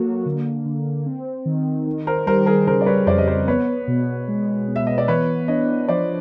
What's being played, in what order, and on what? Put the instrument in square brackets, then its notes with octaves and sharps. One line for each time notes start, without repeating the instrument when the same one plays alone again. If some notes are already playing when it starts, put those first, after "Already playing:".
Already playing: [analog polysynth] F#3 A#3 F#4 [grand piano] A4
[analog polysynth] D3
D3
C4
D#3
D#3
[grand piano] A#4 C5
[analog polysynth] G3 [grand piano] A#4 C5
[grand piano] G#4 A#4
[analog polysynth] C#3 [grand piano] A#4 C5
[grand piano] D5
B4 C#5
[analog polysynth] F2 [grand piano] C5 D5
[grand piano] D#5
C5 D5
[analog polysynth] B3 [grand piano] B4 C#5
[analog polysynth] B2
G#3
B3
[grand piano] E5
D#5
D5
[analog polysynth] E3 [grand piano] B4 C#5
[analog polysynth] D4 [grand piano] C#5 D#5
[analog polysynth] F3 [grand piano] C5 D5